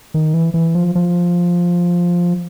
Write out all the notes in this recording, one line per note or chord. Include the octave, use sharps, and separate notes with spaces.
D#3
E3
E3
F3
F3